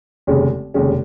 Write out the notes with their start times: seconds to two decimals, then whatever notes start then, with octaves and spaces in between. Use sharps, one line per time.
0.27 F1 D#2 C#3 G#3 C#4
0.74 F1 D#2 C#3 G#3 C#4